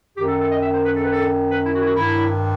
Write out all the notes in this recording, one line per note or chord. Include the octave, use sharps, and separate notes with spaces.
F#2 D#3 G4
A4
A4
D#5
E5
C5
B4
A4
B4
A4
B4
E4
F#4
E4
F#4
G2 D#3 E4